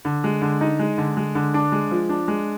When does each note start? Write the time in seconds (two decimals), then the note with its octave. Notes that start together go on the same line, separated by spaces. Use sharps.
0.05 D3
0.24 G#3
0.42 D3
0.61 D#4
0.79 G#3
0.98 D3
1.17 G#3
1.35 D3
1.54 D4
1.72 G#3
1.91 F3
2.09 D4
2.28 G#3